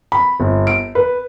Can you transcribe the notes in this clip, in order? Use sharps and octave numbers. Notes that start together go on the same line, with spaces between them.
B5
G1
D7
B4